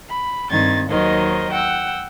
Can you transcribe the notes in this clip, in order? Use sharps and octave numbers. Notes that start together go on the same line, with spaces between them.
B5
G2 D#3 C4 G#6 A6
D#2 D#3 F#3 A#4 C5 D#5
F#5 G5 E6